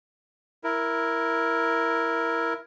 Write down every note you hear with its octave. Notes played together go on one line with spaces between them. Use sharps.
E4 A#4